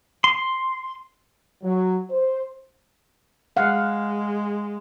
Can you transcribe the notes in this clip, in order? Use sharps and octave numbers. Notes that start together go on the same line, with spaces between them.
C6
F#3
C5
G#3 F5 F#5